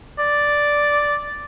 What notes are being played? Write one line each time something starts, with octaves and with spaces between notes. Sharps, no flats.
D5